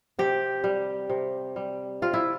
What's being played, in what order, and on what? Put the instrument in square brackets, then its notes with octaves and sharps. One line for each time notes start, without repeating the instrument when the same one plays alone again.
[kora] C3 G4
G3
C3
G3
C3 F4
E4